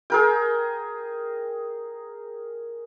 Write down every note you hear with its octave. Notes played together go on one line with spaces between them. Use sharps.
G#4 A#4 G5